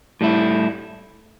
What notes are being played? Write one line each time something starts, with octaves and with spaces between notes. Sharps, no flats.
A2 G3 E4